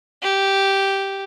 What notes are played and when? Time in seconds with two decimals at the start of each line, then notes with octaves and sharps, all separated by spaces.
0.22 G4